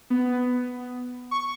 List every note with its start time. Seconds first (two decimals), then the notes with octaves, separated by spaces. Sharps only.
0.10 B3
1.31 C#6